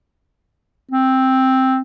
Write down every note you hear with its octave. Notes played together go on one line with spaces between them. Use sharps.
C4